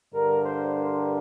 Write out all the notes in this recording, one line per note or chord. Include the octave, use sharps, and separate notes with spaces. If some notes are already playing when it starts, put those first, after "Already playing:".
G2 D3 A#4
C5
A#4